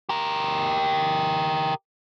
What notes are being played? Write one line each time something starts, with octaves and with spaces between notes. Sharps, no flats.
G4 A#4